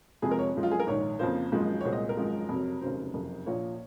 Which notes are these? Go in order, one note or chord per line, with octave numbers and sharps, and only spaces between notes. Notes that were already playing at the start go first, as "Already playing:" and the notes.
F2 C3 F3 G#3 G#4
A#4
C#5
F#2 F3 G#3
F4
G#4
A#4
A#1 G#2 D#3 C#5
F2 C#3 F3 A#3 C5
G#1 F#2 F3 G#3
C#5
C2 A#2 G#3 C5
D#5
A#4
G#1 F#2 F3 G#3
F2 C3 F#3
F1 D#2 C#3 F#3 C5
F#1 F2 C3
A#1 A#2 F3 A#3 C#5